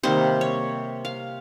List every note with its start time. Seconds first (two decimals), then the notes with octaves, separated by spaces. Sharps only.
0.03 C3 D#3 G3 A#3 C5
0.41 C#5
1.05 F5